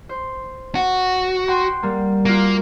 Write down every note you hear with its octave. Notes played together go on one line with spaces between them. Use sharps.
C5
F#4
F#5 G5 C6
G3 A#3
A#3 F4 F#4